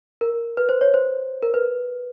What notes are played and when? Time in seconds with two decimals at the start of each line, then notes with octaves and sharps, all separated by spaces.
0.21 A#4
0.57 B4
0.69 C5
0.81 C#5
0.94 C5
1.42 A#4
1.54 B4